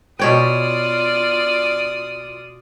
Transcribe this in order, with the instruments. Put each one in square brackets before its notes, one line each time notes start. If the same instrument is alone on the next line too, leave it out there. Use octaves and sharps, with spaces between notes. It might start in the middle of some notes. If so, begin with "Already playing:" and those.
[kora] B2 C#5 G5 [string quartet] F4 D5 D#6